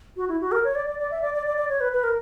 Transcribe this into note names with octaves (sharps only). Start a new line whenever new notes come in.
F#4
E4
F#4
A#4
C#5
D5
D5
D5
E5
D5
D5
D5
D5
C#5
B4
B4
A#4